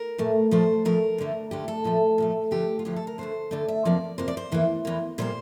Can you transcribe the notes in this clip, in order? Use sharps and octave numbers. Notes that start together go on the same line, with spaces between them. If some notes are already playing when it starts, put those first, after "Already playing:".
Already playing: A#4
A#2 A3
A#2 F3 A3 C5
A#2 F3 A3 A#4
D2 D3 A3
D2 D3 A3 G4
A4
A#2 F3 A3
A#2 F3 A3
D2 D3 F3 A3 G4
F4
D2 D3 F3 A3 G4
A4
A#4
D2 D3 A3 C5
D2 D3 A3 D5
E5
F2 C3 F3 A#3 D5
F2 C3 F3 A#3 C5
D5
C5
E2 E3 A#3
E2 E3 A#3
A#2 G3 A#3 C5